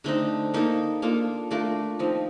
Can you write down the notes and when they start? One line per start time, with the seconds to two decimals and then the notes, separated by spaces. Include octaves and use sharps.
0.04 D3 A3 C4 D#4
0.54 A#3 D#4 A4
1.02 A#3 D4 F4 A4
1.51 A3 D4 F4 A#4
1.99 F3 C4 D#4